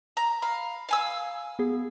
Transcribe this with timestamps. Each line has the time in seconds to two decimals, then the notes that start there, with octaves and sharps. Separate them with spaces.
0.17 A#5
0.42 F5 B5
0.89 F5 G#5 E6
1.59 B3 G#4